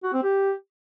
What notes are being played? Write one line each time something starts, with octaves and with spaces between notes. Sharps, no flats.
F#4
C4
G4